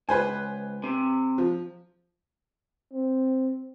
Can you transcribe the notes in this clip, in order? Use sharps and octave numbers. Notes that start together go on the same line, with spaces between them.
C#2 B4 C5 G#5
C3
F3
C4